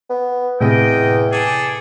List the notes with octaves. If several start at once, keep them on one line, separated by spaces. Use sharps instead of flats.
B3
E2 A2 C3 D#5 G5
G#4 A4 D6